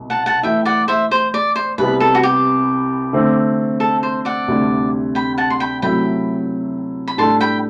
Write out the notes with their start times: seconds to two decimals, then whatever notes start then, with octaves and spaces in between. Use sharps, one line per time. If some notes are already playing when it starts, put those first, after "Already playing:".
Already playing: C2 B2
0.10 F#5 A5
0.26 F#5 A5
0.43 E3 A3 E4 E5 G5
0.65 D5 F#5
0.88 C5 E5
1.11 C5
1.34 D5
1.56 C5
1.78 C2 C3 G3 B3 B4
2.00 A4
2.15 F#4
2.23 G4
3.13 D3 A3 C4
3.80 A4
4.03 C5
4.25 D5 F#5
4.48 D2 C3 G3 D4
5.15 G5 B5
5.38 F#5 A5
5.50 C6
5.60 G5 B5
5.82 C3 F#3 A3 E4 A4 G5 B5
7.08 B5
7.18 A2 G3 D4 A4 A5 C6
7.41 G5 B5